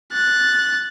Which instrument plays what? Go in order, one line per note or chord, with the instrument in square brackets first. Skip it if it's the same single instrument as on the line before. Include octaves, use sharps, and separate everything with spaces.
[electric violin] F#6 A6